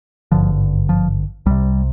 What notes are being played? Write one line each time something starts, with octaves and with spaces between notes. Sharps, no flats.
G#1 G2 D3 F3
F3
C2 C3 G3